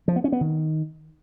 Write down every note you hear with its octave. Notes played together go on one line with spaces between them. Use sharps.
F3
B3
C#4
B3
D#3